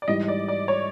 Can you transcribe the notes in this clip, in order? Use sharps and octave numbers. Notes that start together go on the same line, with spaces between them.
D5
G#2 E3 G3 D#5
D5
D5
C#5